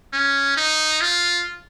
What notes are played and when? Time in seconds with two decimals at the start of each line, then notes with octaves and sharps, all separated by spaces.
0.13 C#4
0.57 D#4
1.01 F4